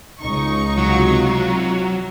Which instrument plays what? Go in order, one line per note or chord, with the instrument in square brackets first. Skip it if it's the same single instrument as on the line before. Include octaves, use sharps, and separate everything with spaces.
[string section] C#2 D#4 C#6
[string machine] C3 F4 F#4 [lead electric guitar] F#3